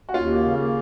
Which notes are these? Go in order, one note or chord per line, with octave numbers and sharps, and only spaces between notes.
F#4
D#2 C#4 F4
A#3
C#3
A#3